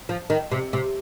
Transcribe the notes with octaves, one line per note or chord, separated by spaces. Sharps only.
F3
D#3
C3
C3